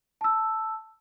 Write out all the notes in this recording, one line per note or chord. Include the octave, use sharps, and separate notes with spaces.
A5 E6